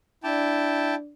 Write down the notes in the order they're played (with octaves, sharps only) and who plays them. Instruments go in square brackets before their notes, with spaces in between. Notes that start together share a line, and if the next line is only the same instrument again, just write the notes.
[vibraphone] D4 D5 [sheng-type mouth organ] E4 G5 A5